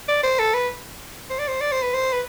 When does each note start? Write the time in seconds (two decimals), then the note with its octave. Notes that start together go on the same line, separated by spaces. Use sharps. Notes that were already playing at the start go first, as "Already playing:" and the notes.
0.08 D5
0.23 C5
0.39 A4
0.54 B4
1.30 C5
1.39 D5
1.48 C5
1.61 D5
1.72 C5
1.82 B4
1.94 C5
2.13 B4